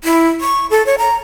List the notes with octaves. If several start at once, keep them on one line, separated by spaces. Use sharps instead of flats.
E4
C#6
A4
C#5
A#5